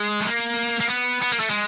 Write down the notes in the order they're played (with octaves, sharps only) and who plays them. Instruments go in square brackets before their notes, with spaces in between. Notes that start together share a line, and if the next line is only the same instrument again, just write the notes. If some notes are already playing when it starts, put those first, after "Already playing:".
Already playing: [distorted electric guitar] G#3
A3
A#3
A#3
B3
B3
A#3
A3
G#3